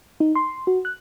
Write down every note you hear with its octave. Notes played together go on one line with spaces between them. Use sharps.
D#4
C6
F#4
F#6